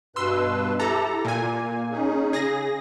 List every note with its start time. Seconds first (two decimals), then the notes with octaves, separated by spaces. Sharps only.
0.16 G2 B2 B4 C6 E6
0.80 E4 G4 A4 A#5
1.25 A#2 A#3 G#5
1.91 C#4 D#4 G#4
2.33 C#3 G#4 A#6